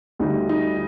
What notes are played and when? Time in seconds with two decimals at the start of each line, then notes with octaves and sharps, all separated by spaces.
0.19 D2 D3 G3 D#4
0.49 D#4